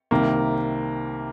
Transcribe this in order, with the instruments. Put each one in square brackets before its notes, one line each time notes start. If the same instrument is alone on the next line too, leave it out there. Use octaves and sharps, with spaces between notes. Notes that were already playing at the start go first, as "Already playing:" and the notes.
[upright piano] C2 C3 D#3 A#3